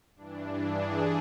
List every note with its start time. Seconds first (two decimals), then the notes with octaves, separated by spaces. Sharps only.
0.16 G2 E3 D4
0.63 G#4